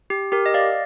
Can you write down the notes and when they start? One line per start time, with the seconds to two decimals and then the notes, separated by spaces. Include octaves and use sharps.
0.10 G4
0.32 G4 A#4
0.46 D#5
0.54 D5 F5